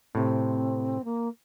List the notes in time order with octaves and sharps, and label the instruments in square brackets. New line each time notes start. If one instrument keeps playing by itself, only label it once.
[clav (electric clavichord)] A2 C3 [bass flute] C4
[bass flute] A#3